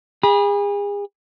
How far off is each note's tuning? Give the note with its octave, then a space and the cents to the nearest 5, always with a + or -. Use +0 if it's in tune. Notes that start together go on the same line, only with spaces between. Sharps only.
G#4 -35 B5 -30